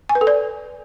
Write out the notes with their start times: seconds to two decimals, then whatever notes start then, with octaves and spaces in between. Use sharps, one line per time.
0.09 G#5
0.15 B4
0.21 A4
0.27 D5